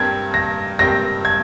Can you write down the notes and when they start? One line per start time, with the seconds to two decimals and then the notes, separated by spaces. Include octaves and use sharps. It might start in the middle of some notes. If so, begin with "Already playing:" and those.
Already playing: G2 G3 C4 G4 A#4 G#6
0.34 A#6
0.79 G2 G3 C4 G4 A#4 A#6
1.25 G#6